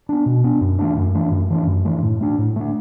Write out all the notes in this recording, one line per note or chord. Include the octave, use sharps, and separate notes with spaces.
B3 D4
B2
B3 D4
F#2
E3 A3 D4
F#2
E3 A3 D4
F#2
E3 A3 D4
F#2
E3 A3 D4
A2
A3 D4
A2
A3 D4